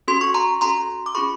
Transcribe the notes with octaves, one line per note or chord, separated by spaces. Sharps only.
C#4 F#4 A4 C6
C#6
A#5 C6
C#4 F#4 A4 A#5 C6
D6
C#4 F4 G#4 B5 C#6